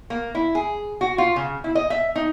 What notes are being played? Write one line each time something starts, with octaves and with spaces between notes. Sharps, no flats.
A#3
E4
G#4
F#4
F4
C#3
E4
D#5
E5
D#4